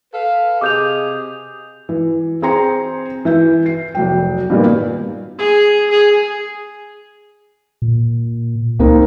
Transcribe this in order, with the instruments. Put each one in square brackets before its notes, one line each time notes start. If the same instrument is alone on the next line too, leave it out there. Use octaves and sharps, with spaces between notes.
[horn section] A4 B4 F5
[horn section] C3 G#4 D#5 [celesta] D6 G6 F7
[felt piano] E3
C4 G#4 G5 A#5 C6 C#7
E3 E5 G6
C7
F1 B1 G5
G2 A#2 D#3 G3 A#3 B3
[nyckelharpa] G#4
G#4
[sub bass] A#2
[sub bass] C#2 [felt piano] A#3 C4 D#4